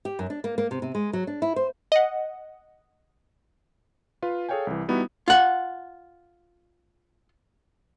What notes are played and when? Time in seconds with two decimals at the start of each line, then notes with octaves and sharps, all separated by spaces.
0.05 G4
0.19 F#2
0.30 D4
0.44 A#3
0.58 A#3
0.71 C3
0.82 C3
0.95 G#3
1.13 F#3
1.27 D4
1.42 E4
1.56 C5
1.92 D#5 F#5
4.23 F4 B4 F5
4.49 G#4 A4 C#5 F5 G5 G#5
4.67 C2 E3
4.88 G3 B3 D#4 E4 F#4
5.28 F4 F#5